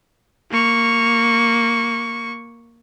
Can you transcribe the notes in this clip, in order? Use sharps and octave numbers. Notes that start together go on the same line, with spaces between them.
A#3 C#6